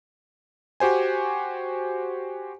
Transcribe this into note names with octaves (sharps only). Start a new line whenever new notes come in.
F#4 G4 C5 G#5